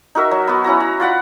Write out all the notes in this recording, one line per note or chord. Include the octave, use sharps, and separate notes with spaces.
D#4 F#4 A#4 E5
F#3
B3 F#4
C#4 E4 F#4 A#5
A#5
F4 D5 F#5 B5